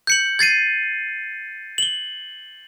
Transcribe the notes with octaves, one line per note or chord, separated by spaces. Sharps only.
G6 C#7 F#7
G#6 A6 C7 D#7
F#7 G7